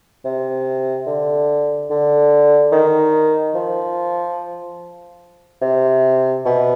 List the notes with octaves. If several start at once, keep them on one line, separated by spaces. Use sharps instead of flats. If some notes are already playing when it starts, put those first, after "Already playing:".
C3
D3
D3
D#3
F3
C3
B2